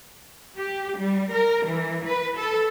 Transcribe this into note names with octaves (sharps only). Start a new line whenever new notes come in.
G4
G3
A#4
E3
B4
A4